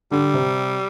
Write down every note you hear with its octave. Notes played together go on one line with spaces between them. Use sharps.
D3 G3
C3